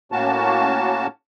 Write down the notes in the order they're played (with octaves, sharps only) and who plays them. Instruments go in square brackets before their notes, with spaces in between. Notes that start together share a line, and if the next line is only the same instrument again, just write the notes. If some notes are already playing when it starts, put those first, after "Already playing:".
[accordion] A2 A#3 C#4 F#4 A5